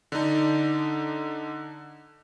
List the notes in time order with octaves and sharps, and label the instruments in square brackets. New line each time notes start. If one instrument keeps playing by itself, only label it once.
[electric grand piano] D3 D4 D#4